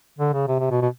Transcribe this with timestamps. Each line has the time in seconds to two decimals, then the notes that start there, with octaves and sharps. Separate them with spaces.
0.19 D3
0.33 C#3
0.48 C3
0.59 C3
0.71 B2
0.82 B2